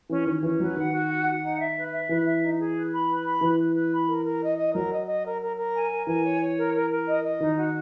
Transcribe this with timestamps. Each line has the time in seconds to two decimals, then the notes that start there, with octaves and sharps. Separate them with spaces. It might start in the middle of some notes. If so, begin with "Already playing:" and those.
0.09 E3 C#4
0.26 D#3 C#4
0.43 E3 C#4
0.60 F#3 B4
0.77 D#3 F#5
0.93 F#4
1.09 F#5
1.26 F#5
1.42 D#4
1.60 E5
1.76 B4
1.92 E5
2.09 E3 B4
2.25 E5
2.42 D#4
2.59 G#4
2.75 B4
2.92 B5
3.09 B4
3.25 B5
3.41 E3 B4
3.59 B4
3.75 B4
3.92 B5
4.08 A#4
4.24 A#4
4.41 D#5
4.58 D#5
4.75 F#3 A#4
4.91 D#5
5.07 D#5
5.24 A#4
5.41 A#4
5.57 A#4
5.74 G#5
5.91 A#4
6.07 E3 G#5
6.24 C#5
6.41 C#5
6.57 A#4
6.74 A#4
6.90 A#4
7.07 D#5
7.23 D#5
7.40 D#3 D#4
7.56 F#4